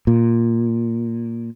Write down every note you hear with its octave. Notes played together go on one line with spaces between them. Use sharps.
A#2